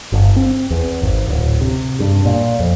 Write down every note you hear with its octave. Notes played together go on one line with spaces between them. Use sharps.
G1
C4
E2
G#1
D1
C3
G2
A#2
F2